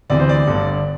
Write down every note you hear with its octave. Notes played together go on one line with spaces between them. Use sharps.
D2 C3 E3 D5
C5
D5
G1 G2 D3